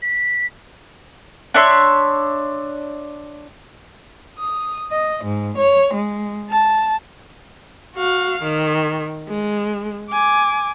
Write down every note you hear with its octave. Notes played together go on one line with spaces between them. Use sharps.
B6
D4 C#5 E5 C6
D#6
D#5
G#2
C#5
G#3
A5
F#4 F5
D#3
G#3
G#5 D6